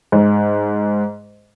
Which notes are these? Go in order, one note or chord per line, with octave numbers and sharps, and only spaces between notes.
G#2